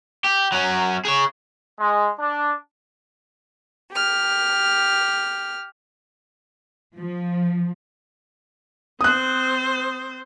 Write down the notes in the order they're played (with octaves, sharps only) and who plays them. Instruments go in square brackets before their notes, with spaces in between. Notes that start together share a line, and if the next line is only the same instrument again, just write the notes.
[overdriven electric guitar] G4
F#3 C#4
G#4 C#5
[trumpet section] G#3
D4
[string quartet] G4 F6
[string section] F3
[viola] C4 C5 [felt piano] D#6 F#6